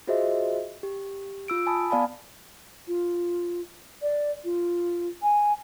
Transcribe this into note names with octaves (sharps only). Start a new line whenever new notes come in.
F4 F#4 G#4 C5 D#5 E5
G4
F4 E6 D7
G#5 A5 B5 D#6
B3 D5 F5 G#5 A5 B5
F4
D5
F4
G#5